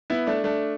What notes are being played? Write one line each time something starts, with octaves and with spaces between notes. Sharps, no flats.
B3 E4
A3 D4
A3 D4